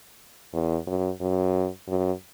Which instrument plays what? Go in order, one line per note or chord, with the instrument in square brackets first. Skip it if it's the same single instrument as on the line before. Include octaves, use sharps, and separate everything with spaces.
[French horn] E2
F#2
F#2
F#2